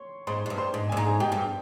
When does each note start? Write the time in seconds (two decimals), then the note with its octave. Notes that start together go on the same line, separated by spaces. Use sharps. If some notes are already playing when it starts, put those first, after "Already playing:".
Already playing: C#5 C6 C#6
0.27 G#2 C5 C6
0.46 G#2
0.50 G2
0.58 C5 C6
0.74 G#2
0.89 G2 G#5
0.97 G#2 A#5
1.06 G#4 G#5
1.20 G#2 G4 G5
1.32 G2
1.41 G5